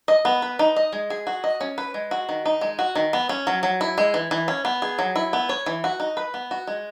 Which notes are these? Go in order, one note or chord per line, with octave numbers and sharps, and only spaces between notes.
D#5
B3
B4
D#4
D#5
G#3
G#4
F#4
D#5
C#4
B4
G#3
F#4
D#3
D#4
G#3
F#4
D#3
B3
C#4
F#3
F#3
E4
G#3
E3
E3
C#4
B3
G#4
F#3
E4
B3
C#5
E3
F#4
D#4
B4
B3
F#4
G#3